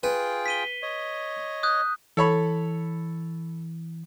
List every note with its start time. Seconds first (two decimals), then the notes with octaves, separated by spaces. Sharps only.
0.03 F4 G#4 B4 G5
0.46 B6 D#7 G7
0.82 C#5 D#5
1.63 D#6 F#6 G6
2.17 E3 A4 C#5 B5